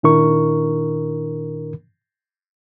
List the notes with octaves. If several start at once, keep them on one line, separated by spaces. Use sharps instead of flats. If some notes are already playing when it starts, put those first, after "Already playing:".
A#2 D#3 D4 E4 A#4 C#6